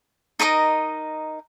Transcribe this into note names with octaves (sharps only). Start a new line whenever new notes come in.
D#4 A#4 D#5 A#5